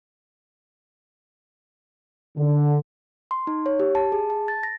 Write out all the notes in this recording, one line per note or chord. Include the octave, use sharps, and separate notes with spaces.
D3
C6
D#4
C#5
G4
A5
G#4
A5
A6
A#6